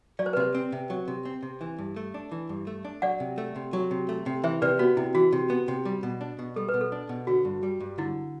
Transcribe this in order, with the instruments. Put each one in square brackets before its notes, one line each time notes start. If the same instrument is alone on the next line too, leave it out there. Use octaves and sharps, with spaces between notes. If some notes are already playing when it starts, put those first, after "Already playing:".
[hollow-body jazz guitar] F#3 [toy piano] D5
[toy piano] C5
B4
[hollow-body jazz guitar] C3 [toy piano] C5
[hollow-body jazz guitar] C4
C3
F#3
C3
C4
C3
E3
G2
A3
D4
E3
G2
A3
D4
[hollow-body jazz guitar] F#3 [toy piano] D5 F#5
[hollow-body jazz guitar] C3
A3
C3
F#3
C3
A3
C3
[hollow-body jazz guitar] E3 [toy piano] C5 E5
[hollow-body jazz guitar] C3 [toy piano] B4 D5
[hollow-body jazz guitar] B3 [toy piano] F#4
[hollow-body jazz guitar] C3 [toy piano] E4
[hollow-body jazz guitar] E3 [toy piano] F#4
[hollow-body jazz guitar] C3
B3
C3
G3
B2
D4
B2
[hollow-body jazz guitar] G3 [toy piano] A4
[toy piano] B4
[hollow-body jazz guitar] B2
[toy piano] A4
[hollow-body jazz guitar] D4
B2
[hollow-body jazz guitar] D3 [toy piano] F#4
[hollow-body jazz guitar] G2
G3
G2
[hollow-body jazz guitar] D3 [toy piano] E4